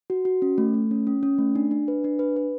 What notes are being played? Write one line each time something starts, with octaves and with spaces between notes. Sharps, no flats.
F#4
F#4
C#4
A3
A3
C#4
C#4
C#4
A3
D4
D4
B4
D4
B4
B4